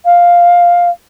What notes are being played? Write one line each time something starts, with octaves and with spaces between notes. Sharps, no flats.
F5